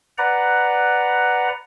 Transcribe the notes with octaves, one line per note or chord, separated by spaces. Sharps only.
B4 D5 F#5 A#5